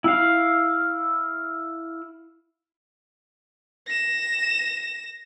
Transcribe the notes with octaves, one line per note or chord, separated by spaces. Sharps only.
E4 F5
A#6 E7